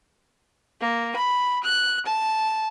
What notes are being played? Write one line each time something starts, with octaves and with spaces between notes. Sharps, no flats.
A#3
B5
F#6
A5